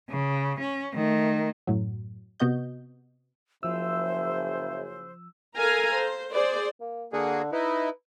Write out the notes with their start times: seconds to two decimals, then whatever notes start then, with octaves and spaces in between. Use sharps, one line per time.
0.10 C#3
0.60 C#4
0.95 D#3 A3
1.67 F#2 A2 F#3
2.40 C3 B3 F#4 D#5 G6
3.63 F#1 C#3 F3 C5 E5 E6
5.57 A4 A#4 F5 G#5 A#5
5.94 C5
6.33 G#4 C5 D5
6.80 A#3
7.13 D3 A#3 F#4 G#4
7.52 D#4 E4 B4